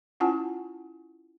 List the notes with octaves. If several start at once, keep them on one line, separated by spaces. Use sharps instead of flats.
C#4 E4 F4 F#5 G#5 A5